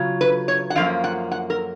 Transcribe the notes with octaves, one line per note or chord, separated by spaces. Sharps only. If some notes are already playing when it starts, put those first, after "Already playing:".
Already playing: C#3 F#3 F4
B4
C#5
F#5
F#2 F3 A#3 F5
F#5
F#5
A#4